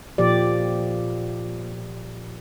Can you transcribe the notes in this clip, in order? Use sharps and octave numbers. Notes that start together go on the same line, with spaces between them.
A#2 F3 G4 D5